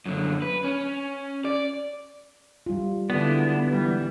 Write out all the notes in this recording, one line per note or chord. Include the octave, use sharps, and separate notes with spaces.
F#2 D3
B4
C#4
D5
G3 F4
D3 G#3 B3 E4 D5
E3 G3